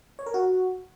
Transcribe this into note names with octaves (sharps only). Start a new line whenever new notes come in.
C#5
A#4
F#4